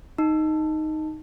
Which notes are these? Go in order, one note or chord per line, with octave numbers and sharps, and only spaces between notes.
D#4